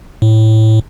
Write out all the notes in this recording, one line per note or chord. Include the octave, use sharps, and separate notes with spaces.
A2